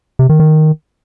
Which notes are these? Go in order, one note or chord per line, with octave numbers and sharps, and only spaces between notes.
C3
D#3
D#3